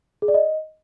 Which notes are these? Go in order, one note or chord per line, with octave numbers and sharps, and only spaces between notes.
G#4
D5
D#5